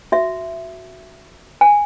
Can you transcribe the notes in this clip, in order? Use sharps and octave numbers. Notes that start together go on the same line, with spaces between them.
F#4 E5
G#5